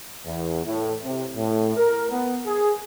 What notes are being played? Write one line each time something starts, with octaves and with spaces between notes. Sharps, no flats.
E2
A2
C3
A2
A#4
B3
G#4